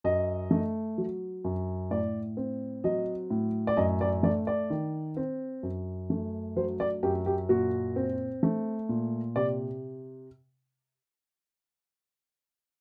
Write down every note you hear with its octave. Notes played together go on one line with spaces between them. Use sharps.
F#2 D#5
A3
F#3
F#2
A2 D5
C4
F#3 D#5
A2
D5
F#2 D#5
D5
A3 D5
D5
D#3
C4
F#2
A3
F#3 C5
D5
F#2 G4
G4
A#2 F#4
C4
A3
A#2
C3 D5